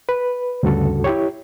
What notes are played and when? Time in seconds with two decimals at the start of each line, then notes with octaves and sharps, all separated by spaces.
0.09 B4
0.63 D2 G2 C#3 F#4 A4
1.04 E4 G4 C#5